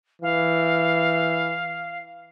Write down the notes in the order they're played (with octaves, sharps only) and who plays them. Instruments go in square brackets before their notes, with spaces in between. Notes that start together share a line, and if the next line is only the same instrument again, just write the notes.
[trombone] E3 [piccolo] F5